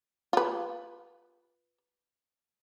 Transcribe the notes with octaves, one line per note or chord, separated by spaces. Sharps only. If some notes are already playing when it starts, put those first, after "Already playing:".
F4 B4